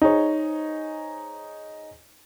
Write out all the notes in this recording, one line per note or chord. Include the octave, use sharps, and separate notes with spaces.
D#4 G#4 C5 C#5